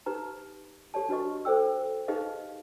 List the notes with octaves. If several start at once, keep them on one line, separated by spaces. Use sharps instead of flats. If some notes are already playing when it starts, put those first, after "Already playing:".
D#4 G4 B4 A#5
G4 C#5 D5 A5
D4 F#4 B4 D#5 C#6
A4 C5 D5 G5 E6
D#4 G4 G#4 B4 D#5 F5